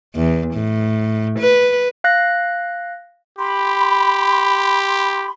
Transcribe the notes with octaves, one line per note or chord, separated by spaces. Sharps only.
E2
A2
B4
F5 F#6 A#6
G4 B5 C6